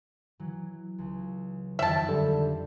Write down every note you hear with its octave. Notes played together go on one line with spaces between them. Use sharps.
E3 F#3
C#2
F2 D#3 E5 G5 A5
F2 D3 G3 A4